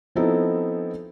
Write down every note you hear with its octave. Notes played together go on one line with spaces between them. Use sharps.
F3 B3 C4 D#4 E4 A4